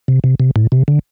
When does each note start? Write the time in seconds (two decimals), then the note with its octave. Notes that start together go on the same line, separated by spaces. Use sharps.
0.08 C3
0.24 C3
0.40 C3
0.56 A2
0.72 C3
0.88 D3